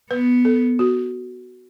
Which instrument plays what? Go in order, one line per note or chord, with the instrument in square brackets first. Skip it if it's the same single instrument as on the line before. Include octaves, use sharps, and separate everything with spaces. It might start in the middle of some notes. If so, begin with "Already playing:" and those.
[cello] B3 [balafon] B4
[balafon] A4
F#4